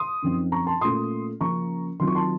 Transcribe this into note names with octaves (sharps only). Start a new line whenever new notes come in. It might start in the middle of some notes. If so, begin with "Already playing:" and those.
Already playing: C6 D#6
F#2 F3 C4 D#4
A#5 C#6
A5 C6
A#2 A3 C#4 F4 C6 D#6
C#3 F3 A#3 C#4 A#5 C#6
D#3 F#3 C4 F4 C6
C#6
A5 C6